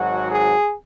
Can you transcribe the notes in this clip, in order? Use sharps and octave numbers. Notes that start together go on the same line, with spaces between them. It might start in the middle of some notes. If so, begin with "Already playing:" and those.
Already playing: G#1 G#2 F#3 F#4
G#4